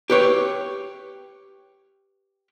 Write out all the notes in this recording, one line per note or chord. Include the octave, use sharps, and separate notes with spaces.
G4 B4 C#5